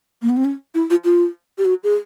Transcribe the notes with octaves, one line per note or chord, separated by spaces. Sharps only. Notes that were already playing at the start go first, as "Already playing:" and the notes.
A#3
B3
C4
C#4
E4
F4
F4
G4
F#4
G#4